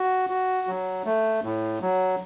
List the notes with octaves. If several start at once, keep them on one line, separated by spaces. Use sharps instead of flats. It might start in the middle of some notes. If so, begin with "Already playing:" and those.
Already playing: F#4
F#4
F#3
A3
A2
F#3